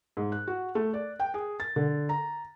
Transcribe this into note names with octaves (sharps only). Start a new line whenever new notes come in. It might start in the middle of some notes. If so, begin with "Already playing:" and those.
G#2
F#6
F#4
A3
D5
G5
G#4
A6
D3
A#5